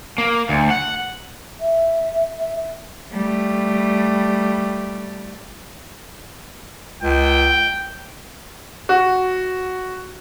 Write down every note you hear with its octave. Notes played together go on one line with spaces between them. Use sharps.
A#3
D2
F#5
E5
E5
G3 A3
C#2 G5
F#4